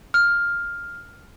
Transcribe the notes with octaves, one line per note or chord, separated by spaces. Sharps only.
F6